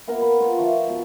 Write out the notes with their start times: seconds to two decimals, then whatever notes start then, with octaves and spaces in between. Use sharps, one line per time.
0.07 A#3 B3 A#4 F#5
0.22 B5
0.40 A#3 F4 A#4
0.58 F3 E5 A5 C#6
0.87 B2 D#4